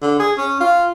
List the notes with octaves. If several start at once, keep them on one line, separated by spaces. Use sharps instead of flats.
D3
G#4
C#4
F4